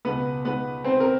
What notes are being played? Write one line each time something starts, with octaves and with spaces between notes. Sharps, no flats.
C#2 B2 B3 B4
B3 B4
C4 C5
A#4